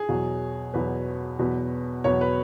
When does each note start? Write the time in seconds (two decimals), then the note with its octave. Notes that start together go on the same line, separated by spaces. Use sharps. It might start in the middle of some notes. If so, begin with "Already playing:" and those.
Already playing: G#4
0.09 E2 B2 F#3
0.74 E2 B2 F#3 B4
1.39 E2 B2 F#3 B3
2.04 E2 B2 F#3 B3 C#5
2.21 B4